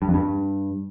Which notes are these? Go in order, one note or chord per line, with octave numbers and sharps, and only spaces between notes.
G2
F2
G2